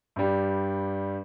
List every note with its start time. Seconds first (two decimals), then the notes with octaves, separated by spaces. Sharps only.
0.16 G2 G3